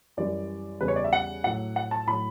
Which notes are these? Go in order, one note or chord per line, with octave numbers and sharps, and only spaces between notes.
F#2 E3 G3 D5
E2 C#3 G3 B4
C#5
D5
E5
F#5
A2 F#3 F#5
F#5
A5
A2 F#3 B5